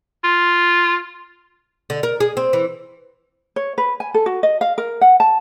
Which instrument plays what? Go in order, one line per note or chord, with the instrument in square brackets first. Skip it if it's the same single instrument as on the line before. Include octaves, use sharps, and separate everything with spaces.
[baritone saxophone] F4
[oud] D3
A#4
G#4
C4
E3
[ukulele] C#5
B4
G#5
A4
F#4
D#5
F5
A#4
F#5
A5